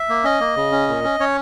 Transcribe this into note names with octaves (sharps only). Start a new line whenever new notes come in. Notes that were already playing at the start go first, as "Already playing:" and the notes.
Already playing: E5
A#3
C#4 D#5
A#3
C#3
C#4
A#2
C#4
C#4 C#5